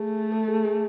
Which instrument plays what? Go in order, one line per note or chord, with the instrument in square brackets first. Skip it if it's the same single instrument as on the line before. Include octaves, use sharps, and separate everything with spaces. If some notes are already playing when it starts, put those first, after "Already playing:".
Already playing: [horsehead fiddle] A3 [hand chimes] G#4
[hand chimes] A4
G#4
G#4